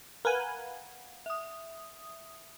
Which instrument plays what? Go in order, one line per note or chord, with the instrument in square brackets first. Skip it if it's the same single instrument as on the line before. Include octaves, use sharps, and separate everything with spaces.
[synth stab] A#4 B4 G#5 [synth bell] F5 F#5
[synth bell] E5 D#6